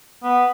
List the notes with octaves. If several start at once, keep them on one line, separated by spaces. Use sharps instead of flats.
B3